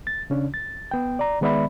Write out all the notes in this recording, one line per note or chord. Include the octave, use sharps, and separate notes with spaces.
A6
C#3 C#4 D4
A6
B3 G5
D5 A#5
D#3 G#3 B3 D5 E5 B5